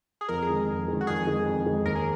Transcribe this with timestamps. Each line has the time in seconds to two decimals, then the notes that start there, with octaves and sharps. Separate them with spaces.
0.21 G#4
0.28 F2 A#4
0.42 G#4
0.49 D#3 G#3
0.68 F2
0.88 D#3 G#3
1.01 F#4
1.07 F2 G#4
1.27 D#3 G#3
1.46 F2
1.66 D#3 G#3
1.85 D#2 A#4
1.95 G#4